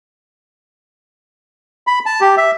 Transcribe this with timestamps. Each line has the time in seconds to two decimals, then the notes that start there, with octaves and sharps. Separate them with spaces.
1.87 B5
2.06 A5
2.21 G4
2.37 E5